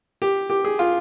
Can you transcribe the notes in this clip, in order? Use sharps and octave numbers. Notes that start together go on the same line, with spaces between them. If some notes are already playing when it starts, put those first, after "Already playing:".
G4
G4
G#4
F4